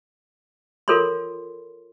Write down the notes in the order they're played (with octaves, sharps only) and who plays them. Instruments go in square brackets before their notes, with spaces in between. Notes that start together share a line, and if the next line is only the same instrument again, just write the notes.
[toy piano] F4 A4 A#4 C#5 B5 C6